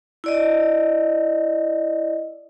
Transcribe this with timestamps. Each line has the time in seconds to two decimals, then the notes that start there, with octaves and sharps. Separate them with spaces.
0.24 E4 D5 D#5